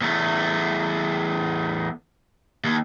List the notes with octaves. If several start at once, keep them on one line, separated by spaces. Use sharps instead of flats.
E2 A3
D#2